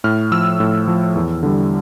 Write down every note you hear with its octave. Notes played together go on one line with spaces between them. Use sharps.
A2 F6
F3 E6
A2
F3
E2
D3 G3